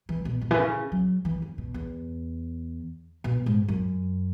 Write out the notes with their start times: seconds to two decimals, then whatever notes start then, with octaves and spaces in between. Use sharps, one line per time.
0.09 E3
0.25 B2
0.41 B2
0.51 E3
0.58 C#3
0.92 F#3
1.25 E3
1.42 C#3
1.58 B2
1.74 E2
3.24 B2
3.46 G#2
3.68 F#2